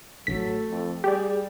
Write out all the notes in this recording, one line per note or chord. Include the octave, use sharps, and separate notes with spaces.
A1 F#3 A3 A4 B6
F2
G3 G4 G#4 D5